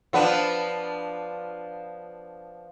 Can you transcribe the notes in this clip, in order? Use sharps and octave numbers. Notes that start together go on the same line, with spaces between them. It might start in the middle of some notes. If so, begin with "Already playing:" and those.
F3 B3 D4